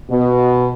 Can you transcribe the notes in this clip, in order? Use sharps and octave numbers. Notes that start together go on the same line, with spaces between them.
B2